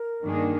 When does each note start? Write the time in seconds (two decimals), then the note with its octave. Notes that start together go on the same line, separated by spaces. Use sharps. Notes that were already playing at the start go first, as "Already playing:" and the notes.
Already playing: A#4
0.23 G2 D#3 A#3 D4 G#4